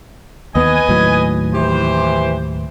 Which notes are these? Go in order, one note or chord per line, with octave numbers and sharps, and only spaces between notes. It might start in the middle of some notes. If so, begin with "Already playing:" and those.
D#2 B3 B4 D#5 G#5
D#2 A2 F#3
E3 G4 C5